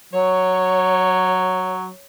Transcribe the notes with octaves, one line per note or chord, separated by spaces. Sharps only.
F#3 C#5